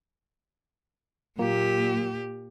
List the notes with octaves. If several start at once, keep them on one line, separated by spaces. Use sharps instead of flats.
A#2 F#3 A#3 F4 G4